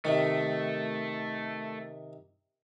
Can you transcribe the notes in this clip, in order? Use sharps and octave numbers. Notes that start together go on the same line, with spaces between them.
C3 D#3 A3